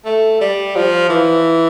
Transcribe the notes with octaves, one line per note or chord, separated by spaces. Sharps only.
A3
G3
F3
E3